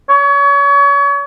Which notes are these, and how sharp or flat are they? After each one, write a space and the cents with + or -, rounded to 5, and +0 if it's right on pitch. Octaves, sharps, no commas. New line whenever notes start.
C#5 +35